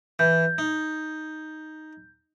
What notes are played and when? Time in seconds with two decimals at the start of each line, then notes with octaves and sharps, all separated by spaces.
0.19 E3 G6
0.58 D#4